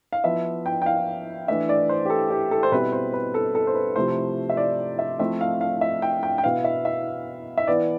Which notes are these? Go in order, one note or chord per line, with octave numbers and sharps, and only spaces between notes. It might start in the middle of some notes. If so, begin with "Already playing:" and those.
F5
F3 B3 E4 E5
G5
G5
F5
E3 A3 D4 E5
D5
C5
G4
A4
G4
A4
C5
B2 G3 C4 E4 B4
C5
B4
A4
A4
C5
B4
C3 F3 A3 E4 C5
E5
D5
E5
F3 A3 C4 E4 E5
F5
F5
E5
G5
G5
G5
B2 B3 E4 F5
E5
E5
E5
E3 B3 E4 D5